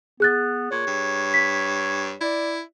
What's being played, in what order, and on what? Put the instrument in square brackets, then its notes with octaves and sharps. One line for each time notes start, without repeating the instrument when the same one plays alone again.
[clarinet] B3 [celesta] G#4 F#6 A6
[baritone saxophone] A#2 [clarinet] C#5
[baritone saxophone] G2
[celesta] B6
[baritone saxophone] E4 [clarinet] D5